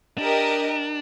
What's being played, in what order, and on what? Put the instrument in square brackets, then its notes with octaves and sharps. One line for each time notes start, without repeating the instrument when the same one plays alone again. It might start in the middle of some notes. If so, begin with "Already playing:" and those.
[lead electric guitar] D4 [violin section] G4 A#4 D#5